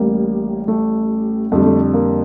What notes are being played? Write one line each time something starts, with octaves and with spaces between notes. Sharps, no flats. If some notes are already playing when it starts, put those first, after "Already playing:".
Already playing: A1 A2 G3 A#3
A3
F2 D3 G3 A3
A3
A#3